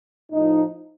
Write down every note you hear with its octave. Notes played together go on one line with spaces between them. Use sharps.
A2 F3 D#4